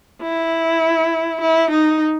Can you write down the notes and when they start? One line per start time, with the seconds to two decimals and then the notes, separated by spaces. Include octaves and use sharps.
0.22 E4
1.41 E4
1.71 D#4